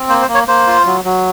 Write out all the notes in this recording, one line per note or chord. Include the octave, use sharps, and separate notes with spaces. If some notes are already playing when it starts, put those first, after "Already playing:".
Already playing: C4
A#3 C5
C5
A#3
C#5
A#3 C5
F4
F#3
F#3